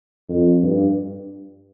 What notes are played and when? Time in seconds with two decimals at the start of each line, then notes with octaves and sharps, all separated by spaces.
0.29 F2
0.63 G2